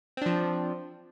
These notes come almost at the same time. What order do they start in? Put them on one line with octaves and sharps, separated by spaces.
C4 D4 F3